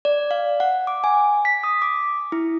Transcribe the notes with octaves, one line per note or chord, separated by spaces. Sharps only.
D5
F5
F#5
D6
G#5
B6
D#6
D6
E4